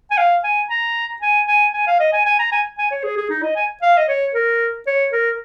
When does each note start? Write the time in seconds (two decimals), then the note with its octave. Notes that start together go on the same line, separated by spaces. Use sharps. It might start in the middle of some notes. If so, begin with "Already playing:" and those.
0.11 G#5
0.18 F5
0.44 G#5
0.70 A#5
1.22 G#5
1.48 G#5
1.73 G#5
1.87 F5
2.00 D#5
2.13 G#5
2.26 G#5
2.39 A#5
2.52 G#5
2.78 G#5
2.91 C#5
3.04 G#4
3.17 G#4
3.30 D#4
3.43 D#5
3.56 G#5
3.82 F5
3.97 D#5
4.08 C#5
4.34 A#4
4.87 C#5
5.12 A#4